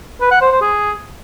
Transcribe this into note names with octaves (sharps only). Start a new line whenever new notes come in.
B4
F#5
C5
C5
G#4